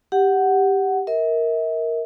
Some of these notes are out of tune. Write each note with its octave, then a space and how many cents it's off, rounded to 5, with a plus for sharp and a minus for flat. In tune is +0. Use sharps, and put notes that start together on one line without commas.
G4 +5 F#5 +10
A#4 +0 E5 -45